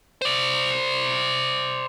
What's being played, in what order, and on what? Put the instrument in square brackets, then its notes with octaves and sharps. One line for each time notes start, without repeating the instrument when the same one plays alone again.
[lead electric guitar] C5 D5